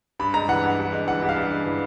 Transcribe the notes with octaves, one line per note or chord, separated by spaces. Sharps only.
G2 B5
G#3 A#5
E3 F#5
G2
G2
G#3
E3 F#5
G2
F5
G2
G#3
E3